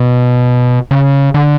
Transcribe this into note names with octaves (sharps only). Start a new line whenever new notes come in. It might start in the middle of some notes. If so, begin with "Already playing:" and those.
Already playing: B2
C#3
D3